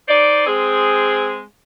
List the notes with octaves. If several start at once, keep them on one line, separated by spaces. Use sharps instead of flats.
D#4 C5 D5
G#3 C4 G#4